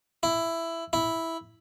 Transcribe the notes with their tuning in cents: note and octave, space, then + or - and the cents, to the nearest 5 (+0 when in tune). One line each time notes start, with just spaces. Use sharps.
E4 +10
E4 -5